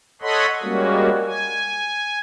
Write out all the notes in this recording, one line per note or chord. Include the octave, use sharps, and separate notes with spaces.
A4 C#5 D#5 F#5 B5 C6
G3 G#3 A#3 C#4 F#4
G#5